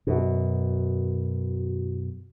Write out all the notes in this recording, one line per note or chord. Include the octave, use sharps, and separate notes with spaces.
F#2 B2